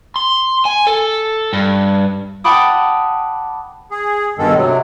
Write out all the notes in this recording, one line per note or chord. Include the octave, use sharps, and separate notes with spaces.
C6
G#5
A4
G2
F#5 G5 A5 B5 D6 D#6
G#4
G2 B2 D#3 G#3 A4
C3 F#3